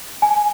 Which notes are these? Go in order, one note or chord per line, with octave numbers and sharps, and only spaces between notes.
G#5